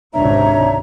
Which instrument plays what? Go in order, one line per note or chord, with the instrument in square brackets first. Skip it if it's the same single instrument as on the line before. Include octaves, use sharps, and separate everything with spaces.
[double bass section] G#1 C#2 C3 [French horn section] D4 [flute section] D#4 C#5 A#5 [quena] E5